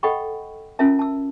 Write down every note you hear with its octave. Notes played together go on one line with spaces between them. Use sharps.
A4 D#5 F#5 G5 B5 C#6
C#4 F4 A#4 E5 A5
A5 E6